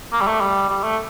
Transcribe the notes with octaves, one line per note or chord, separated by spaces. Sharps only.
A#3
G3
A3
G3
G3
A3